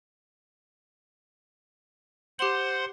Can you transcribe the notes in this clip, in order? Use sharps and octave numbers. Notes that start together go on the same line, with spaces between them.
G4 C5 F#5 C6 F#7